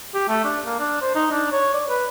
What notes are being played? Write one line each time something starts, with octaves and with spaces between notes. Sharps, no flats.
G4
A3
D4
A#3
D4
C5
D#4
D4
C#5
D5
B4